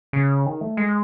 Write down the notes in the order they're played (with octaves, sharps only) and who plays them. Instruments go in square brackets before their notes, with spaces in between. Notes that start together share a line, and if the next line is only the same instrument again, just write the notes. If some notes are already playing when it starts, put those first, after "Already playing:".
[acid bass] C#3
D#3
A3
G#3